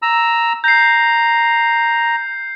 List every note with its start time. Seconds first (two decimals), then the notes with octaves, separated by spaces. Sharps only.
0.02 A#5 E6
0.64 A#5 G6 C7